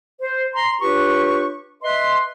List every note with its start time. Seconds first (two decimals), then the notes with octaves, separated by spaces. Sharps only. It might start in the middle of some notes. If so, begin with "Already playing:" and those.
0.22 C5
0.54 A#5 C6
0.81 D4 F4 G4 B4 C#5 C#6
1.83 B4 D#5 E5 C6